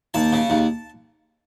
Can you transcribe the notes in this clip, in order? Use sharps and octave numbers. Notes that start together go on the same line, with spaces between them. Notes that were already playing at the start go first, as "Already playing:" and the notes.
D#2 A5
C#3
D#2